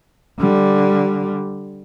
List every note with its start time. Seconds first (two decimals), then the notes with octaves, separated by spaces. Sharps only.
0.39 D3 G3